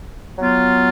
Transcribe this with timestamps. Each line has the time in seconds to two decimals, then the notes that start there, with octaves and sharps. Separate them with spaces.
0.37 F#3 B3 F4